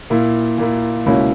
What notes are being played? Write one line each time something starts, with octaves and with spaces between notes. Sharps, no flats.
A#2 A#3 E4
A#2 A#3 E4
C#2 B2 A#3 C#4 E4